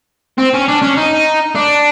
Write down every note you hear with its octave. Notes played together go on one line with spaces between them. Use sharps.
C4
C#4
D4
C#4
D#4
D4